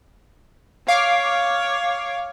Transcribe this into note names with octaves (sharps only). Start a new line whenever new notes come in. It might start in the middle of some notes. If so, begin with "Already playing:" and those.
C#5 F5 D6